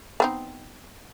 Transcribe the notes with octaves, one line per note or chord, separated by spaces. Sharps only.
B3 C4 D#4